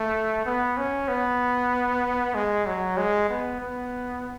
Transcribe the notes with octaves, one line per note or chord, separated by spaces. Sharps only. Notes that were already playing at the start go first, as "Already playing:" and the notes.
Already playing: A3
B3
C#4
B3
G#3
F#3
G#3
B3
B3